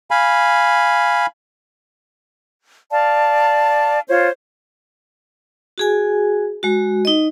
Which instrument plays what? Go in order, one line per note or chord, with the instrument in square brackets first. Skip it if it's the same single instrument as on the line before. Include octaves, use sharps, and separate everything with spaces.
[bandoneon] F5 G#5 B5
[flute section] D5 F5 A5
F4 C5 C#5
[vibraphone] F#4 G#4 G#5
G#3 F#4
D#4 D#5